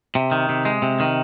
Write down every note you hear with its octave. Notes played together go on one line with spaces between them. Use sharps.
C3
D#3
C3
G#3
C3
D#3